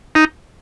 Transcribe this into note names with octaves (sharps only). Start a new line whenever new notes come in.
D#4